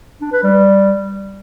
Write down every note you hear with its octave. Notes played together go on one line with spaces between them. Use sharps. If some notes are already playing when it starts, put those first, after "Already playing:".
D4
B4
G3